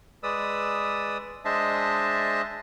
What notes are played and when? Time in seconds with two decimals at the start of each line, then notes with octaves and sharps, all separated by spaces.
0.23 G#3 B4 D5 D#6 E6
1.45 G#3 D4 C5 D#5 E5 A5